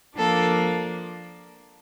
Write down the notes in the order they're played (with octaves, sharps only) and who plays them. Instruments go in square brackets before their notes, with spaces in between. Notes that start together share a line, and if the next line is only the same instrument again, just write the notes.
[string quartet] F3 A#3 D4 A4